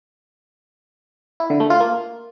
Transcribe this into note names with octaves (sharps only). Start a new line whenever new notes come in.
E4
D3
A3
F4
A#3